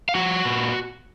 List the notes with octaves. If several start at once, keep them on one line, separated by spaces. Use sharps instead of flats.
F5
F3 F#4 F#5
A#2